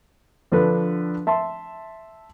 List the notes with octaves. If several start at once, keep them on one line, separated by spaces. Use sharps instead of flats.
D3 F3 D4 A4 B4
E5 A5 C6